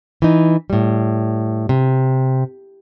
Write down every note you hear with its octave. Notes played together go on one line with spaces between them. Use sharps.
E3 D#4
A2 G3
C3